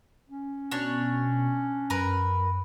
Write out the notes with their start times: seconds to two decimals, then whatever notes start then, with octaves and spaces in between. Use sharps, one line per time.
0.29 C#4
0.71 B2 D4 C#5
1.90 F#2 A#4 B4